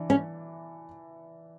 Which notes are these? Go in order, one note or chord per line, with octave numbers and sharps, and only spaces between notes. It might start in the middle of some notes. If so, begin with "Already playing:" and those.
Already playing: E3 D4
C#4